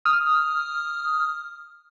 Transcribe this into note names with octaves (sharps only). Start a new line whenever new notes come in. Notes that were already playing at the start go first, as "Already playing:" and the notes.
D#6 F6